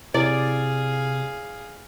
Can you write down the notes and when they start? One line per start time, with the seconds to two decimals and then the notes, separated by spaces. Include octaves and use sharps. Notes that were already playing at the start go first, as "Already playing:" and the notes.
0.14 C3 E4 G#4 D5 F5